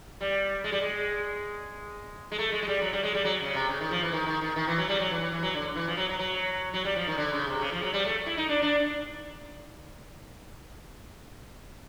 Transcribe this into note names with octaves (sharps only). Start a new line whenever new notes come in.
G3
G#3
G3
G#3
G#3
A3
G#3
G#3
G3
F#3
G3
G#3
G3
F#3
C#3
C3
C#3
D#3
F3
E3
D#3
D#3
D#3
D#3
E3
F#3
G3
F#3
E3
E3
E3
F#3
D3
E3
F3
F#3
F#3
F#3
F#3
G3
F3
D#3
D3
C#3
C3
C#3
F3
F#3
G3
A3
E4
D#4
D4
D4